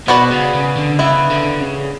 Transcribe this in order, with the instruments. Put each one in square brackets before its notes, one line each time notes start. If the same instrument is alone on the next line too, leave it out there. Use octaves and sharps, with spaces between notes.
[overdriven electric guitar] B2 [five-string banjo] B3 F#4 B4 D5
[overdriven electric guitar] C#3
C#3
D3
[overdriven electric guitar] C#3 [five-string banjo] E3 B3 E4
[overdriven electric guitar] D3
C#3